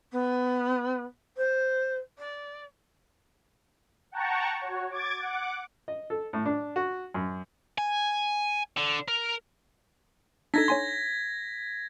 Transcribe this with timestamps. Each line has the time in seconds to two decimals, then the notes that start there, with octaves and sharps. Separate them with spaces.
0.12 B3
1.37 C5
2.18 D5
4.12 F#5 G5 A5 A#5 C#6
4.61 F#4 C#5
4.90 D6 G#6 A6
5.19 F#5 D6
5.88 D#5
6.10 A4
6.33 A2
6.45 D4
6.76 F#4
7.14 F#2
7.78 G#5
8.77 D3
9.08 A#4
10.54 D4 D#4 A4 G#6 A#6 B6
10.68 C#5 G#5 C6